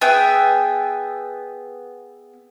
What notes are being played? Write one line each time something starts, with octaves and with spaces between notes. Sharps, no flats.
B3 G#4 E5 G5